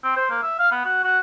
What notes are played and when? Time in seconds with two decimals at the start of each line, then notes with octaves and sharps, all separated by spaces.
0.04 C4
0.16 C5
0.30 A#3
0.42 E5
0.59 F5
0.72 B3
0.85 F#4
1.04 F#4